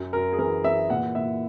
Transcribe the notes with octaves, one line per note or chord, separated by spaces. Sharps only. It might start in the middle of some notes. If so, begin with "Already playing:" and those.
Already playing: F#2
F#2 A#4
G#4
E3 A#4
E3 E5
A#2 F#5
A#2 E5